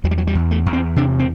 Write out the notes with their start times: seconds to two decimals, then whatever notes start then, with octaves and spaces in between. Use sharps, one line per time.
0.04 E2 F#3
0.11 G3
0.18 F#3
0.27 G3
0.35 E2
0.51 A3
0.66 E2
0.73 C4
0.96 C3 D4
1.19 C4